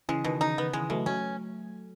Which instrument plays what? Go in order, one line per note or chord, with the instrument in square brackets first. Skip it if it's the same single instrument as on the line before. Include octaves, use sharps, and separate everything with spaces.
[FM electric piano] C#3 E3 [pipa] G#3
[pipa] B2 [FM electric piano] D#3
[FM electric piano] C#3 [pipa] D#4
[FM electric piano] D#3 [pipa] B3
[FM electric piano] C#3 E3 [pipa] G#3
[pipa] B2 [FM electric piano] F#3 A3
[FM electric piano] F#3 A3 [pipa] C#4